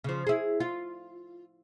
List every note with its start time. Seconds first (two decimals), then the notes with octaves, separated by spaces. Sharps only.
0.04 C#3 F3
0.27 E4 G#4
0.60 F4